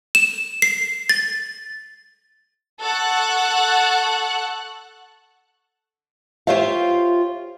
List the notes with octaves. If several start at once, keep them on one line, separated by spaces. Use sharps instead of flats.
E7
C7
A6
A4 F#5 C#6 F#6
F4 G4 C5 C#5 E5 F5